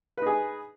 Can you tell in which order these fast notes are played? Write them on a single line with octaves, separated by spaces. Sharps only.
B4 D#4 G#4